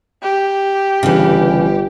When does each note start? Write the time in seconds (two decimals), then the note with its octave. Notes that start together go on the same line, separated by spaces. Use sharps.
0.23 G4
1.03 G1 C#3 E3